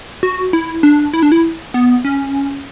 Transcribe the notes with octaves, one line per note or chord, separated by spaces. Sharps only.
F#4
E4
D4
E4
D4
E4
B3
C#4